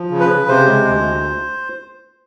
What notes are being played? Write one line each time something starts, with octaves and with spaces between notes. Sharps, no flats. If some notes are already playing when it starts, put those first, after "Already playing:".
Already playing: F3
C#3
B4
C#3
C3 C5
G#3
D2